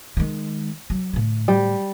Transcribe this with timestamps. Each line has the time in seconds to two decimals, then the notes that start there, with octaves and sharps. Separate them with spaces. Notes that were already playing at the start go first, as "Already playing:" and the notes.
0.17 D#3 G#3
0.90 F#3
1.13 A2 D3
1.48 G3